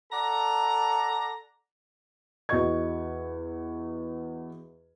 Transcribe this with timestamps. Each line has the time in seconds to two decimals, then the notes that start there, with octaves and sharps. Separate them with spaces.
0.12 A4 D5 F#5 A#5
2.49 E2 F#4 D#5 C#6 G#6